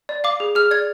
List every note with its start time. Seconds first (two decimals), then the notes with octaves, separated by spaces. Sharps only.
0.09 D5
0.24 F5 D6
0.40 G#4
0.55 G#4 F6
0.71 D5 G#6